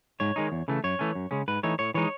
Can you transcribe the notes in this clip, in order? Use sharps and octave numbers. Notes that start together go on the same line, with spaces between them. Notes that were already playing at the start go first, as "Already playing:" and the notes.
G#2 C#5
D#3 G#3 D#4
E2
C#3 E3 A3
F#2 C#5
E3 A3 C#4
F#2
C#3 G#3 C#4
G#2 B4
E3 A3 D#4 C#5
A2 C#5
E3 G#3 D#4 C#5